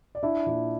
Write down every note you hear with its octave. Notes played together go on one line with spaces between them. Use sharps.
D5
D4 E4 E5
A#2